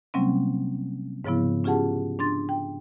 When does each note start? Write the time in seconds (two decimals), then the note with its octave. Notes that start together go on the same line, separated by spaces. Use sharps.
0.14 C3 F#3 G3 A#3 C4 C#4
1.25 G#2 C#3 F3 B3 E4
1.64 C#4 F4 G4 G#4 F#5 A5
2.19 D4 C6 A6
2.49 G5